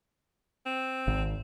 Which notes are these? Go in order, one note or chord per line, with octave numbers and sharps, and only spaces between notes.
C4
G#1